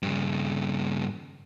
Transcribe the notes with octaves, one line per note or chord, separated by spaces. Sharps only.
G2 C#3